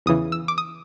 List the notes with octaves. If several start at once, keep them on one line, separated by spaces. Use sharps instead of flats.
E2 C#3 E3 D#6
E6
D6
D#6